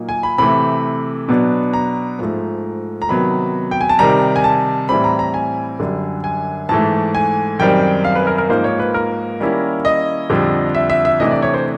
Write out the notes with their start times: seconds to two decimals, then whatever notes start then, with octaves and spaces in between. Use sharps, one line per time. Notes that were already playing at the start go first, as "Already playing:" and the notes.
Already playing: A#2 F#3 A#3 D#4
0.09 G#5
0.23 B5
0.38 C3 E3 A3 B5
1.28 B2 F#3 B3 D4
1.73 A#5
2.19 G#2 F3 A3
3.02 A#5
3.09 C3 D#3 F#3 B3 B5
3.71 G5
3.81 G#5
3.89 A5
3.99 C3 D#3 G3 A#5
4.36 G#5
4.44 A5
4.89 A2 E3 G3 C4 B5
5.04 A#5
5.19 A#5
5.34 G#5
5.79 F#2 D3 G3
6.24 G#5
6.69 G#2 E3 A3 A5
7.15 G#5
7.59 F#2 D#3 G3 C4 G5
8.04 F5
8.15 B4
8.27 A#4
8.38 A#4
8.49 G#2 F3 A#3 D#4 C5
8.64 C#5
8.79 B4
8.94 A#4
9.40 D#3 G3 A#3 C#4 E4
9.85 D#5
10.30 F2 D3 G3
10.75 E5
10.90 E5
11.05 E5
11.20 C3 E3 A3 D4 D#5
11.31 D5
11.42 C#5
11.54 C5